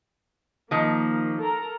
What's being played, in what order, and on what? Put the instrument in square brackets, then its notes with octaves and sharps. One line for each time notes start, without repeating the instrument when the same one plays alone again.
[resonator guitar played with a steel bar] D#3 F3 [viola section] A#3
[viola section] A4 A#4 A#5